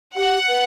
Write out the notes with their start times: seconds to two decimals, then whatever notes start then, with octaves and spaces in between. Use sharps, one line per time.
0.16 G4 F#5
0.48 B4